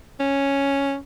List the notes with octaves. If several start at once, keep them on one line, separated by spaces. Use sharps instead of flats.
C#4